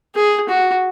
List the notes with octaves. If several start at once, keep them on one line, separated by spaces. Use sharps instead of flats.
G#4
F#4